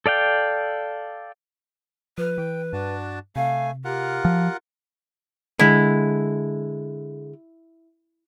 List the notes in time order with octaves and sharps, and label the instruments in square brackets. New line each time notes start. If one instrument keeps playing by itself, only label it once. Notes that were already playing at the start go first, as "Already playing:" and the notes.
[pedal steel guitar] A4 D5 F5 G5
[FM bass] F3 [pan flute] B4 [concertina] F6
[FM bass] E3 [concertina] G5
[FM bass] G2 [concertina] D4 F#4 A5
[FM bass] C3 [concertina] A3 G#5 [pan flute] F5
[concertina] F4 A#4 F#5 [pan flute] G4
[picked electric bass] F3
[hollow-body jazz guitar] D3 G#3 [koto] E4